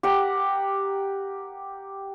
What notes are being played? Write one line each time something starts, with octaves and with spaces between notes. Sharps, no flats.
G4 A#4 F#5